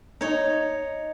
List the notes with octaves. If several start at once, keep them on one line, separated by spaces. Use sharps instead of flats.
D#4 C#5